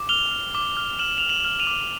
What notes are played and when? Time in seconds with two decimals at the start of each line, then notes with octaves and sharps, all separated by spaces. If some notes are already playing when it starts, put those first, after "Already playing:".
Already playing: D6
0.09 F6 F7 G7
0.31 F6
0.55 D6
0.77 F6
0.99 F6 E7 F#7
1.18 F6 F7
1.29 E7 F#7
1.45 F6
1.60 D#7 F7
1.67 D6